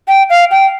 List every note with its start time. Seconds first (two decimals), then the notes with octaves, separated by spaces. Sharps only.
0.08 G5
0.30 F5
0.51 G5